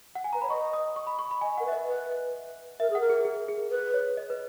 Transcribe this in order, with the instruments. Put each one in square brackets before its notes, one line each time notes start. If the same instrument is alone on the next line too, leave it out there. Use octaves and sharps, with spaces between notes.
[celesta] F#5
G#5
[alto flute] B4 [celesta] A#5
[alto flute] C#5 [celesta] B5
[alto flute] D#5 [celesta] C#6
[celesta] D#6
C#6
B5
C#6
B5
[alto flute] D#5 [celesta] G#5
[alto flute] A#4 [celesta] F#5
[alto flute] B4
[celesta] E5
D#5
[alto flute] B4
[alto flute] A#4 [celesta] E5
[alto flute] G#4 [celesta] F#5
[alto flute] A#4
[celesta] G#4
G#4
G#4
[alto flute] B4
[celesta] C#5
D#5
B4